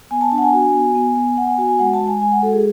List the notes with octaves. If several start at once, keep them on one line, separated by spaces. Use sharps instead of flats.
B3 G#5
A5
D4 A5
F#5
G#5
F#4
B3
B3
B3
B3 F#5
G#5
F#4 G#5
G#5
G#3 F#5
A5
G#3
G#5
G#3 G#5
F#5
F#4 A4
G#4